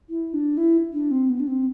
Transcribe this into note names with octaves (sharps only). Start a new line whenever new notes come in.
E4
D4
E4
D4
C4
B3
D4
C4